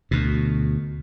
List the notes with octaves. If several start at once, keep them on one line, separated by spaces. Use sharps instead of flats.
D2 B2